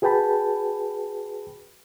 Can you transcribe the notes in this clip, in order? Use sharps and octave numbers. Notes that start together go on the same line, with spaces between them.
F#4 G#4 B4 G5 A5 B5